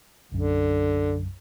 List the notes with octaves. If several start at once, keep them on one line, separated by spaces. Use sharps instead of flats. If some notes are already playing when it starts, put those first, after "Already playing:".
B1 F#2 D3